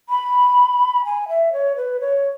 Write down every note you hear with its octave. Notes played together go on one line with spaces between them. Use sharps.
B5
G#5
E5
C#5
B4
C#5